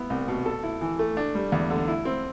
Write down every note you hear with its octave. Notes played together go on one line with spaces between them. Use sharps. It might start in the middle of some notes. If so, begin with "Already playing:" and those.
Already playing: B3 E4
C2
B2
A4
E4
E3
A3
D4
G3
E2
D3
E4
C4